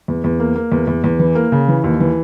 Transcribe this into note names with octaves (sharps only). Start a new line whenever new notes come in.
E2
E2
A#3
A#3
E2
E2
E2
E3
A#3
C#3
E3
D#2
E3